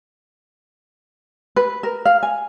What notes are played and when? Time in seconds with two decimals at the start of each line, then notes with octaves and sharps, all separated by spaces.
1.56 B4
1.83 A#4
2.05 F5
2.23 G#5